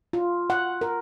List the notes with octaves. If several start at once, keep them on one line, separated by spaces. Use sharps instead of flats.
F4
F#5
A#4